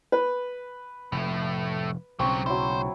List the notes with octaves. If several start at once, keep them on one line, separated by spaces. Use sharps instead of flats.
B4
F1 A2 A3
B1 C#3 F#3 G3 C4 C#5
F#3 E4 C5